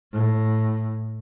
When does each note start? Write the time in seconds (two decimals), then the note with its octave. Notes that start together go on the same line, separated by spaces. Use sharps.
0.12 A2